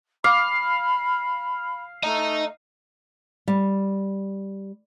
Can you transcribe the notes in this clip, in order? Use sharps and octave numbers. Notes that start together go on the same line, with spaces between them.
F5 B5 D6
A3 D#5 A#5
G3